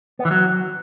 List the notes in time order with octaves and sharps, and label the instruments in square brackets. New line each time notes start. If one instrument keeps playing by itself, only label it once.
[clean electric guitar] B3
E3
F#3